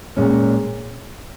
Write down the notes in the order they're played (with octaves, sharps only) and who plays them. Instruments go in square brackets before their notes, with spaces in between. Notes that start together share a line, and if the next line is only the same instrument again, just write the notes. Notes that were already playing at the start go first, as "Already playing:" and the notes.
[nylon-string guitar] A#2 G#3 C#4